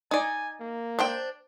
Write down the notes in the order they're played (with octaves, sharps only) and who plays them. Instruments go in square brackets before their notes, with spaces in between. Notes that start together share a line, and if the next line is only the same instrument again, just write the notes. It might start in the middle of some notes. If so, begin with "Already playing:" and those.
[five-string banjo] D#4 D5 [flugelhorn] G#5
[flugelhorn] A#3
[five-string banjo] D4 C5 G5